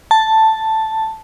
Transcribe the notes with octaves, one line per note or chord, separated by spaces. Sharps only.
A5